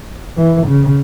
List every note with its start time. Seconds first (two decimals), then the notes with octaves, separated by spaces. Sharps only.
0.37 E3
0.67 C#3